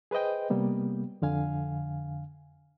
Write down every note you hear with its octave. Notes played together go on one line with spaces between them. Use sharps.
G#4 B4 C5 D#5 G5
C3 G3 A#3 B3
F2 D3 F5 G#5